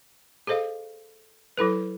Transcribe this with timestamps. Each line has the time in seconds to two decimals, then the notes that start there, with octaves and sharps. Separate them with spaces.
0.47 G#4 A4 C5 D#5 F5
1.57 F#3 E4 A4 B4